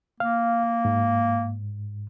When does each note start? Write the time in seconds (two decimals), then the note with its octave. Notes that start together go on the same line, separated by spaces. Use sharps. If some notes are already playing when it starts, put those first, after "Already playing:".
0.20 A#3 F5
0.85 G#2